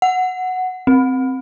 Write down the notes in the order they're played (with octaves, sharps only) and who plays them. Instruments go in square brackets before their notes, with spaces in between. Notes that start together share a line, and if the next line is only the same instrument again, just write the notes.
[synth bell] F#5
C4